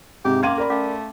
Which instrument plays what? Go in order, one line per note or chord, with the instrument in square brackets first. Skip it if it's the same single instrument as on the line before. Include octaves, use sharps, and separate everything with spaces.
[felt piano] G#2 C3 [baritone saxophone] G4
[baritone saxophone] A#3 [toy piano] C#4 C6 D6 [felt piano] F5 G#6 D#7
[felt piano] A#4 D5 B5
[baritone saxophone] A3 [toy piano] C#4 F5 D6